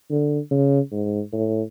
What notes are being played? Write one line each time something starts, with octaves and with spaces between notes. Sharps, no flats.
D3
C#3
G#2
A2